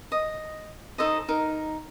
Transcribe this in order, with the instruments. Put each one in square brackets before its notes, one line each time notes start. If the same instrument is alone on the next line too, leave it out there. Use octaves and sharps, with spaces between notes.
[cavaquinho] D#5
D#4 A4 C5 D#5
D#4 A#4